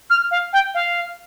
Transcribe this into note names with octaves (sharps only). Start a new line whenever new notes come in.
F6
F5
G5
F5